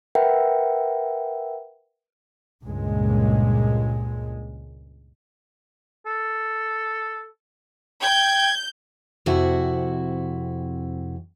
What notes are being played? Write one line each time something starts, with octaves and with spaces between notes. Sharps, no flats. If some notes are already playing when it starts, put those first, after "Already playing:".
A#4 B4 E5 F#5 G5
C#2 G2 A#2 G#3
A4
G5 G6 G#6
F2 C3 E4 F#4